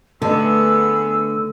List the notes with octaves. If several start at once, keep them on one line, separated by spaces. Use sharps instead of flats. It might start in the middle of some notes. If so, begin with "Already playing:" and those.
D3 A3 B3 G#4 A4 B4 D#5 E6